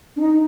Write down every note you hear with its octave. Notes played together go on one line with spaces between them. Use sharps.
D4
D#4